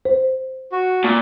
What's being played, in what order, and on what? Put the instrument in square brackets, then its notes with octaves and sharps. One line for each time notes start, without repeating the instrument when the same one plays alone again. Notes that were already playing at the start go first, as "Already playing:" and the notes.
[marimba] C5
[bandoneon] F#4
[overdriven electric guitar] A#2